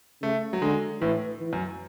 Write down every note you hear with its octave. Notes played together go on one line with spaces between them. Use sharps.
C#3 A3
F#3
D3 G#3
A2 E3
E3
F#2